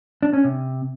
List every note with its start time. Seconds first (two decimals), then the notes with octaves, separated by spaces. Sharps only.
0.23 D4
0.33 C#4
0.44 C3